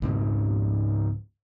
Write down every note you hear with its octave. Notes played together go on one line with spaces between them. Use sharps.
C#2 G#2 C#3 C4